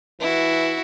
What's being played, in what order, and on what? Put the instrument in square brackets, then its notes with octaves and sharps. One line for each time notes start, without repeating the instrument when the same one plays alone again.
[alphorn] E3 [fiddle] E4 F#4